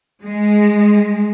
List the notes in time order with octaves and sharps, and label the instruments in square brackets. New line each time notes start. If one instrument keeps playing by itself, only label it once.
[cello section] G#3